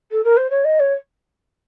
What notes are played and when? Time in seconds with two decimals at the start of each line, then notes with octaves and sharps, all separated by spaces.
0.11 A4
0.24 A#4
0.37 C5
0.50 C#5
0.64 D#5
0.79 C#5